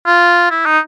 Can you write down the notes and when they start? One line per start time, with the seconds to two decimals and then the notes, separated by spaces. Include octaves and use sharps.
0.06 F4
0.51 E4
0.66 D#4